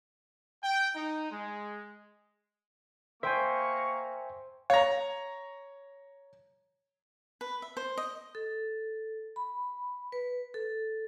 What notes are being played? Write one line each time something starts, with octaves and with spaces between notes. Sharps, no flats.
G5
D#4
G#3
A#3 C5 E5 G5 G#5 A#5 C#6
C#5 F5 A#5
B4
E5
C5
D#5
A4
B5
B4
A4